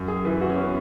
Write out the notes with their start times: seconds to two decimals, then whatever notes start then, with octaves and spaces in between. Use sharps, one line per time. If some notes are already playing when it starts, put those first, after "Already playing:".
Already playing: F#2
0.08 G#4
0.25 E3 B4
0.41 F#4
0.50 C#4
0.57 B3